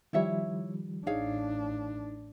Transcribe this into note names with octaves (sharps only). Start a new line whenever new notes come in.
D#3 F3 G3 E4 C#5 E5
A1 D4 D#4 G#4 C#5 F5